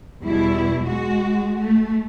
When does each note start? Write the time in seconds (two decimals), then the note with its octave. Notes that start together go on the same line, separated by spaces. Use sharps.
0.22 E2 B2 G3 E4
0.82 G#3 F#4
1.57 A3